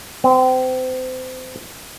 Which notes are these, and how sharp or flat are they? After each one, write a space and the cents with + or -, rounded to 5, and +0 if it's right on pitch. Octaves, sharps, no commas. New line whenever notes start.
C4 -30